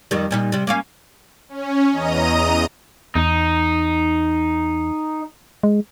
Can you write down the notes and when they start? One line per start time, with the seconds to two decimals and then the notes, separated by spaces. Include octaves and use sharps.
0.11 F2 D#3 G3
0.31 A#2 G3 D#4
0.52 C3 G3
0.67 A#3 C#4 F5
1.49 C#4
1.92 E2 D#5 A#5 D#6 D#7
3.15 E2 D#4
5.63 G#3